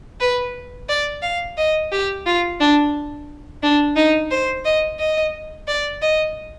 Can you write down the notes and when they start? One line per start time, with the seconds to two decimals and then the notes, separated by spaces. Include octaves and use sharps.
0.21 B4
0.89 D5
1.23 F5
1.57 D#5
1.92 G4
2.26 F4
2.60 D4
3.63 D4
3.96 D#4
4.31 C5
4.65 D#5
4.99 D#5
5.68 D5
6.02 D#5